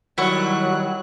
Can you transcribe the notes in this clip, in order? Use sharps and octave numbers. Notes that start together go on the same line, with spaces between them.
D#3 F#3 G3 E4 F#5 C#6 F#6